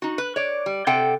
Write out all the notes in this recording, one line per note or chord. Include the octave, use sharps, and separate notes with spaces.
D#4 F#4
B4
C#5 D5
G3
C3 A4 F#5 G5